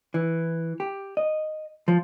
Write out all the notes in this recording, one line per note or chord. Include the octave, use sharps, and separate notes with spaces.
E3
G4
D#5
F3